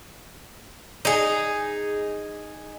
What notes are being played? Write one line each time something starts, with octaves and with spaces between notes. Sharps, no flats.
D#4 G#4